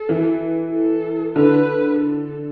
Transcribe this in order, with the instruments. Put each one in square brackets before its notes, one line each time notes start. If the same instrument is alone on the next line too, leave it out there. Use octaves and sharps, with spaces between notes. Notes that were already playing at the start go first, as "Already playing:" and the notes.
Already playing: [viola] A4
[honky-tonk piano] E3
[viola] A4
[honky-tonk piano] D3 [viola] B4
[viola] A4